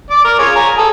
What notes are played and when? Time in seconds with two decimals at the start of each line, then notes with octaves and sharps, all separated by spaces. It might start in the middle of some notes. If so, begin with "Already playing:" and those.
0.10 D5 D6
0.24 A#4
0.39 F4 G#4 C#5
0.56 G#5 A#5
0.78 G#4 A4